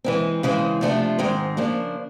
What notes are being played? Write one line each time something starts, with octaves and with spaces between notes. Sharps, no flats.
E3 G#3 C4
C#3 E3 G#3 C4
C3 F3 A3 D4 F4
G#2 D#3 G#3 C4
C#3 F3 A#3 D4